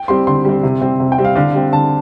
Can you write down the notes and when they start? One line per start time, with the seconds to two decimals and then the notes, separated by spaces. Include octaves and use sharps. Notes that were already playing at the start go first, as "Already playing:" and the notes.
Already playing: G5
0.08 G3 C4 C6
0.27 D3 C6
0.45 G3 C4
0.63 C3
0.81 G3 C4
1.00 C3
1.12 G5
1.18 G3 C4
1.25 F5
1.36 D3 F5
1.54 G3 C4
1.72 D3 A5